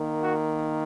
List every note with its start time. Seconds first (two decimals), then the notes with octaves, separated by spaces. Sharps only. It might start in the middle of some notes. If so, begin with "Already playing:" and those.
Already playing: D#3 A#3
0.20 F#4